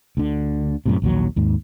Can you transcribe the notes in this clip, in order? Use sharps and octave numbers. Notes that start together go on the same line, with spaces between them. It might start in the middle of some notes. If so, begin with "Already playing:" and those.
D2 D3
F#2 A2 C3
A#1 D#2 F#3
D#2 G#2